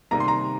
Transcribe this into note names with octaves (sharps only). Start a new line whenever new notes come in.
C3 D#3 G3 A#3 A#5
C6
A#5